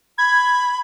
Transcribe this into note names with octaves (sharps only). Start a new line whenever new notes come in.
B5 G#6